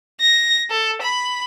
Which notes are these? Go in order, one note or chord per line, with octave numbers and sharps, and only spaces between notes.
A#6
A4
B5